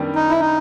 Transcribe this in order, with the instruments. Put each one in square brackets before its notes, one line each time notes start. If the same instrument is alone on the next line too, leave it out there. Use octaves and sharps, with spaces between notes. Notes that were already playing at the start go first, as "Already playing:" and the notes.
Already playing: [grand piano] F#2 D#3 G3 B3 D4
[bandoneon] D#4
E4
D#4